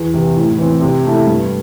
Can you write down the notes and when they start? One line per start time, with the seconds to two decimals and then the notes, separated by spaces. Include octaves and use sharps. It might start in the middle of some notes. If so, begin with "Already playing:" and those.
Already playing: E2
0.14 C3 E3
0.37 A2
0.58 E3 C4
0.81 C3
1.05 A3 E4 A4
1.27 G2